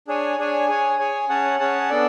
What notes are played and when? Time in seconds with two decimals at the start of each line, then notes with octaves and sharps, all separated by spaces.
0.08 D4 G#4 C#5 G#5
0.38 D4 G#4 C#5 G#5
0.68 G#4 C#5 G#5
0.99 G#4 C#5 G#5
1.29 C#4 G#4 C#5 F#5 A5
1.59 C#4 G#4 C#5 F#5 A5
1.90 B3 D4 A4 D5